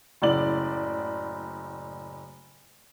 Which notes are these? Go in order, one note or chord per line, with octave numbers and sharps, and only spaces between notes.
F#1 A2 D5 F#7